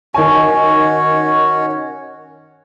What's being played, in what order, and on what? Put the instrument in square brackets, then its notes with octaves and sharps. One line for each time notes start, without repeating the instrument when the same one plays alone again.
[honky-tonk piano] D#3 G#5 [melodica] C#4 F#4 C#5